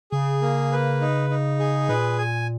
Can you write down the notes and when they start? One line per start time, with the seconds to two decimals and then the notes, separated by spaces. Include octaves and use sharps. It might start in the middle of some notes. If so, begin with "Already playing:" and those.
0.12 C#3 G#4
0.41 A#3
0.72 B4
1.01 D#4
1.30 D#4
1.59 G#4
1.89 A#2 B4
2.18 G#5